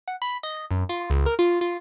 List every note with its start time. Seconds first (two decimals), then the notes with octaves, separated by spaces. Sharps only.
0.08 F#5
0.22 B5
0.43 D#5
0.71 F#2
0.89 F4
1.10 C#2
1.26 A#4
1.39 F4
1.61 F4